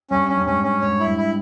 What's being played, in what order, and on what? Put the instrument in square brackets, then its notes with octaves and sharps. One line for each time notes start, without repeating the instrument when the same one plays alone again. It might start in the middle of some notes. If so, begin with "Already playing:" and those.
[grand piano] G2 [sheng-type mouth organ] C#4
[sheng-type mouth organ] C#4
[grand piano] G2
[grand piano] G#2 [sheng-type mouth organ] C#4
[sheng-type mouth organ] C#4
[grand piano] G#2 [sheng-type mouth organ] C#5
[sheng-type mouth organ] E4
[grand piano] G2
[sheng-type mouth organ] E4